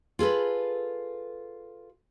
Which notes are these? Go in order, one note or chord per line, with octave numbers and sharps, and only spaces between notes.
F4 G#4 A4 B4